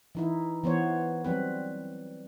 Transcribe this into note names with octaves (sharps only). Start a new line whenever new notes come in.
E3 D#4 E4
E3 B3 C5 C#5
F#3 G3 C4 B4